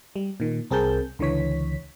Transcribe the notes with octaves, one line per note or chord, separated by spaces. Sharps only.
G3
A#2 D#3
C2 C4 G#4 A#4 A5 G6
C#2 D3 E3 C#5 B6